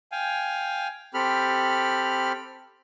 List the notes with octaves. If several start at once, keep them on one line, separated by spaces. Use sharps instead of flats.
F5 G5 G#5
C4 G4 A4 B5 F6